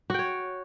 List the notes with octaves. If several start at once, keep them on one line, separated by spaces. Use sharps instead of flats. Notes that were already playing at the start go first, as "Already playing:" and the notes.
F#4 C#5 G5